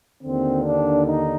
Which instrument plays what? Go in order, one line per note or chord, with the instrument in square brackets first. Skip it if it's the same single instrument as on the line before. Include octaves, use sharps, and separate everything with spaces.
[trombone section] D#2 D3 C4
D4
D#4